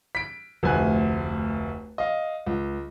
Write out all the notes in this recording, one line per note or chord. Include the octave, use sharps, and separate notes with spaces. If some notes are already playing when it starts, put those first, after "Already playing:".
B6 D7
F1 D2 G#5 F#6
D#5 F5
C#2